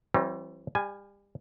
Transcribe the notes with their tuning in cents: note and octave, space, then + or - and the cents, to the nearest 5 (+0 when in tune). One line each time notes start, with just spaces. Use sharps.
E3 +10 G3 -40 C4 +40
G3 +30 G#5 +0